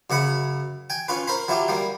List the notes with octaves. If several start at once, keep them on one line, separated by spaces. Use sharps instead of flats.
F#2 C#3 F#5 B5
G5 G#5
C#4 F4 B4
A#4 C5 B5
F#3 E4 F4 G4
G3 A#3